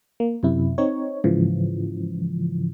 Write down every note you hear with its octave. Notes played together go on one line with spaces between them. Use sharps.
A#3
F#2 C3 E4
C4 D#4 C#5
G#2 C#3 E3 F3